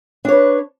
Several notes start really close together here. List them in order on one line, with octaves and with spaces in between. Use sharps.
D4 C#5 B4